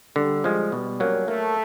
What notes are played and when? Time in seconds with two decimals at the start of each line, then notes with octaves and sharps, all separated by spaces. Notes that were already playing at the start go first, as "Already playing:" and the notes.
0.16 D3 G3
0.44 F3 G#3
0.72 B2 G3
1.00 F#3 A#3 C#4
1.28 A3 A#3